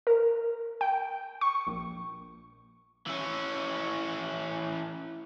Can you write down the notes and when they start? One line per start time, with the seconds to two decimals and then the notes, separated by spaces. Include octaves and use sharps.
0.07 A#4
0.81 G5
1.41 C#6
1.67 A#1
3.07 E3 C#4